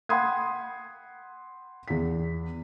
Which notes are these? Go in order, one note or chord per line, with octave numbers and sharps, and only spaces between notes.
F#5 G5 B5 C6 D#6 G#6
E2 B6